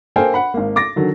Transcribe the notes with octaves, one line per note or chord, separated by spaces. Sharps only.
A#3 A4 A#4 C5 G5 G#5
F#5 B5
G#1 A#3
D6 A6 A#6
D3 D#3 F#3